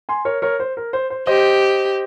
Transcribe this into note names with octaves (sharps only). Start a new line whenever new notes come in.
G#5 C6
A#4 C#5
A#4 C#5
C5
A#4
C5
C5
G4 C5 D#5